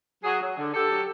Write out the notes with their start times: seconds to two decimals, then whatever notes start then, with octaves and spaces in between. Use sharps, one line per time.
0.23 F#3 F#4 G#4
0.41 F#3
0.57 D3
0.73 D3 G4 A4
0.90 F#3